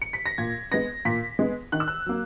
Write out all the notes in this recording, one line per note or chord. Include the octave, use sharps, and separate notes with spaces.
C#7
B6
A#6
A#2 G#6
G#3 B3 A#6
A#2 B6
G#3 B3
D#3 F#6
E6
F#6
F#3 A#3